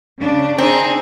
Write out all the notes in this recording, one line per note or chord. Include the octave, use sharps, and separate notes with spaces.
C#3 D4
C4 D4 D#4 G#4